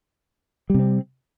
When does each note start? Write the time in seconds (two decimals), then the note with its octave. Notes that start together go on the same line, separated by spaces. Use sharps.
0.70 G3
0.74 C3
0.79 C4